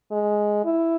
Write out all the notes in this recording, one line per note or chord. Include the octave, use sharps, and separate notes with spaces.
G#3
E4